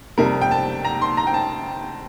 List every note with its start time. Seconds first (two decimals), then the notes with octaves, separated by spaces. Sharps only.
0.18 F2 C3 G3 A#4
0.41 G5
0.51 A5
0.85 A#5
1.02 C6
1.17 A#5
1.27 G5
1.34 A5